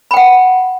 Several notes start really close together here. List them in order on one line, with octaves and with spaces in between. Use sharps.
B5 G5 F#5